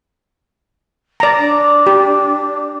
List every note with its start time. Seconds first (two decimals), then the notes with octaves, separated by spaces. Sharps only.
1.20 D5 A#5
1.38 D4
1.87 G4